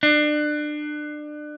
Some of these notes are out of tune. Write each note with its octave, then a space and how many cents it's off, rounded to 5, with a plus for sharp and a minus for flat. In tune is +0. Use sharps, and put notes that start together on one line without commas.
D4 +30